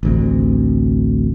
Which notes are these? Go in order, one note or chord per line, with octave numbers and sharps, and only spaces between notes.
A1 D2 C3